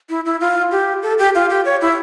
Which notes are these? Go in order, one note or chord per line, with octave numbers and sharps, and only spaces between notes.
E4
E4
F4
G4
A4
G4
F4
G4
C#5
E4